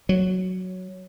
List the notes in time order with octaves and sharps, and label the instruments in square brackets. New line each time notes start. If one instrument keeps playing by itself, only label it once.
[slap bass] F#3